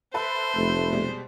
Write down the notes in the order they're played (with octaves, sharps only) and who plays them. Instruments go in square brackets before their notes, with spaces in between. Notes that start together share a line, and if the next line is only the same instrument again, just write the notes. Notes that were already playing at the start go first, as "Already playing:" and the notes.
[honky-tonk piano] A4 B4 E5 [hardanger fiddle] C5
[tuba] F1 [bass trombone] A3
[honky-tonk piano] B2 G3 G#3